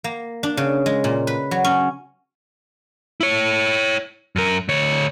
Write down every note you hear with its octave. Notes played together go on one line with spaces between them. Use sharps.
A#3
D4
C#3
G#3
A#2
B4
F#3
C#4
E4 C#5
F#2 A#4
D2 C#5